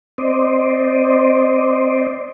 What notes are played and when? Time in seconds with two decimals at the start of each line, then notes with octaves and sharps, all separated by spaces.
0.18 C4 C5 D5 D#5